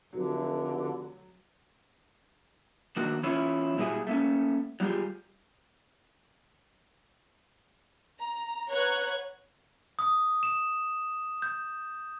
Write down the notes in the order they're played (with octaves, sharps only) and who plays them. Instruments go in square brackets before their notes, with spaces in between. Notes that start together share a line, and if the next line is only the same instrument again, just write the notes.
[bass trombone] F1 [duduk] D3 [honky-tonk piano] F#3
[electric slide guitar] D#3 A#3 D4 F#4
E3 C#4 E4 F4 C#5
A#2 G3 E4 F#4 G#4 G#5
A3 A#3 C#4
F#3 G3 F4 G4 G#4
[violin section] A#5
B4 C#5 F#5 A#5 F#6 G#6
[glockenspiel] D#6
E7
G6